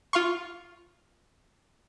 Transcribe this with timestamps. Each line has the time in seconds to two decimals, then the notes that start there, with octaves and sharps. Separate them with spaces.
0.13 F4 F5 C6 C#6